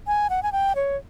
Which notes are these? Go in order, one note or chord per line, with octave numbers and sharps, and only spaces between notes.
G#5
F#5
G#5
G5
C#5